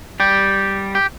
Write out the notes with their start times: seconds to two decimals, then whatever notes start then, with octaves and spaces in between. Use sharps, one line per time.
0.20 G3 G4
0.95 G4